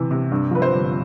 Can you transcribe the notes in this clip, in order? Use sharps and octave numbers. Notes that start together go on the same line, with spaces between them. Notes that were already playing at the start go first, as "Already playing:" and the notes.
Already playing: C3 E3
C3
G2
F3 B4
C5
G1